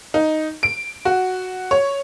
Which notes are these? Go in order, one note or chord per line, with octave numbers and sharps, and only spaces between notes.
D#4
D7
F#4
C#5